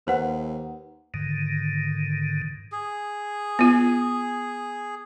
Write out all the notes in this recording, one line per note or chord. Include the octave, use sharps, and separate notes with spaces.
D#2 B4 C5 F#5
G#2 D3 D#3
G#4
B3 F4